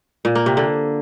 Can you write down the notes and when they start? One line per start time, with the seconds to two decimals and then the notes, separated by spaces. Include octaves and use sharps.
0.25 A#2
0.35 A#3
0.46 C3
0.57 D3